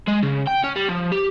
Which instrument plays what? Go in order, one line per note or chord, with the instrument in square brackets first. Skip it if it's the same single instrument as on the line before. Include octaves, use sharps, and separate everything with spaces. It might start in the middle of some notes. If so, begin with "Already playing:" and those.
[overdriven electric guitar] G#3
C#3
G5
C#4
G3
F3
G4